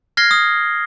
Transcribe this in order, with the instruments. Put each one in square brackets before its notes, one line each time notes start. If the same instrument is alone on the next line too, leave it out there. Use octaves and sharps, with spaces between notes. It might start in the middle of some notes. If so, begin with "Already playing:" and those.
[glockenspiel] F6 G#6 A#6 C7 G7
D#6